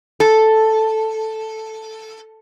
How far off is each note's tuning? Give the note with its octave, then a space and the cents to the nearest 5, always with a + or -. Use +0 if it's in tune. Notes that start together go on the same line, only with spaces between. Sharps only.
A4 +0